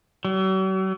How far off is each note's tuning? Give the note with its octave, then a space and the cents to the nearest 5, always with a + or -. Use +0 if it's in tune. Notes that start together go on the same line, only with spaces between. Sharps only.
F#3 +45